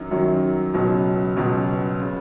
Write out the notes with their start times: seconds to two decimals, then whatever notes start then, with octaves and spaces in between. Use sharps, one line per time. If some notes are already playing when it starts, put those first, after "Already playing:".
Already playing: F#2 D#3 F#3
0.11 F#2 D#3 F#3
0.74 C#2 B2 F#3
1.36 C#2 B2 F#3
2.01 C#3